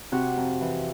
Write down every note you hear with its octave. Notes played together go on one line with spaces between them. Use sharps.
C3 F#4
F2
E3